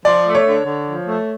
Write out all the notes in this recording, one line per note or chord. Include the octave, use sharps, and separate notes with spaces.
F3 D5
A3
C#5
D3
D3
F3
A3